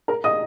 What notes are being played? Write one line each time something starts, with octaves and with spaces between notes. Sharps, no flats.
A#4 A#5
D#5 D#6